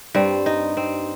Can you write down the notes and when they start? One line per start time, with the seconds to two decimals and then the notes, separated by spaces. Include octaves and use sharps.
0.15 G2 G3 C4
0.46 D#4
0.77 C4